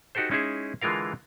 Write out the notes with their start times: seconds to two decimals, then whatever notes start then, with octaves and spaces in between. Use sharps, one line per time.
0.15 D#4 F#4 G4 A4 C5
0.31 G#3 C#4 D#4 E4 G#4 E5
0.81 D3 E3 G#3 F4 A#4 F5